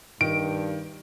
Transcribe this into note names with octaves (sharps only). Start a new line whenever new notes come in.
G2 D#3 D7